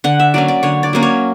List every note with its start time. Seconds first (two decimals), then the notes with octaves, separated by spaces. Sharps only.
0.04 D3 F#5
0.20 E5
0.34 F#3 A#3 C#4 D5
0.48 D5
0.63 D3 C#5
0.83 D5
0.93 F#3 A#3 C#4
1.03 C#5